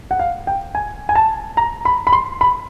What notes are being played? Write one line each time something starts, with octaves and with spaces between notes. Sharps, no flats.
F#5
F5
G5
G#5
G#5
A5
A#5
B5
B5
C6
B5